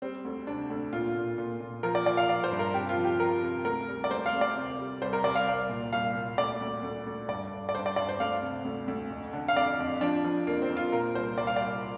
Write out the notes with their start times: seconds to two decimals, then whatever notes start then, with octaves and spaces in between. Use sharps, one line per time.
0.02 G3 C4
0.25 D2
0.47 C3 D4
0.70 D2
0.93 A#2 F4
1.15 A#2
1.38 A#2
1.60 A#2
1.83 F3 A#4
1.95 D5
2.06 F3 D5
2.17 F5
2.29 F3 D5
2.44 C5
2.51 G2
2.59 A#4
2.74 C3 G4
2.89 F4
2.97 F3
3.05 G4
3.20 F3 A#4
3.43 C3
3.65 D2 A#4
3.88 G3
4.04 D5
4.11 D2 C5
4.26 F5
4.33 D2
4.41 D5
4.56 C3
4.79 G3
5.02 C2 C5
5.13 A#4
5.24 C2 D5
5.35 F5
5.47 C2
5.69 A#2
5.93 C2 F5
6.15 A#2
6.38 D2 D5
6.61 D2
6.83 D2
7.07 D2
7.28 G2 D5
7.51 G2
7.69 D5
7.74 G2 C5
7.86 D5
7.96 G2 D5
8.09 C5
8.20 D2 F5
8.42 C3
8.65 D2
8.88 D2
9.11 F2
9.33 D3
9.48 F5
9.56 F2 D5
9.79 F2
10.01 F3 D4
10.25 F3
10.47 F2 A#3
10.62 C4
10.70 F2
10.77 F4
10.92 A#2 A#4
11.15 C2 C5
11.38 C2 D5
11.47 F5
11.56 C2 D5